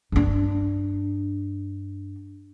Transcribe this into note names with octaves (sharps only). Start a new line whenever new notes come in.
G2 D4